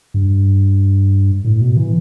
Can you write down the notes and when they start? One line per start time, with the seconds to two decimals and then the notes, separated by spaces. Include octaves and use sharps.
0.14 G2
1.44 A2
1.61 B2
1.77 E3